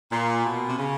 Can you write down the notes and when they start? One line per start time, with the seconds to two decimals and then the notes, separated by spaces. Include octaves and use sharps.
0.12 A#2
0.45 B2
0.68 C3
0.78 C#3